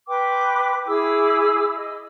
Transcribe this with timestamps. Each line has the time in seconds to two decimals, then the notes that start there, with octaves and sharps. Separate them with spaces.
0.07 B4 G5 C6 D6
0.86 E4 G#4 D6 E6
1.75 D#5